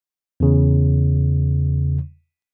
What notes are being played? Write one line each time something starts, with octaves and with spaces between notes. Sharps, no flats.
E2 C#3